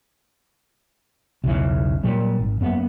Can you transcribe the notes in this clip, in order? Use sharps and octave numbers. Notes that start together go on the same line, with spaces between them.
B1 E2 C#3 E3
A#2 F#3 G3
G#1
F#2 A#3 B3